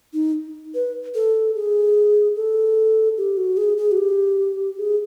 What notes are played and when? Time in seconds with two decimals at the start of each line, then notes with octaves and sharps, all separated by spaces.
0.13 D#4
0.75 B4
1.15 A4
1.56 G#4
2.36 A4
3.17 G4
3.37 F#4
3.57 G#4
3.77 G#4
3.92 F#4
3.97 G4
4.78 G#4